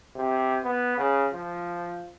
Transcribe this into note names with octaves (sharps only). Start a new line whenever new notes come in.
C3
B3
C#3
F3